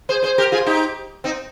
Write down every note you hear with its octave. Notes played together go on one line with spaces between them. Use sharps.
G#4 C5
G#4 C5
G4 A#4
F4 G#4
D#4 G4
C4 D#4